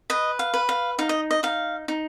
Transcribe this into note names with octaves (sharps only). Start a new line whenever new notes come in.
B4 D#5
F5
B4
F5
D#4 F5
D#5
D#5
D#4 F5
D#4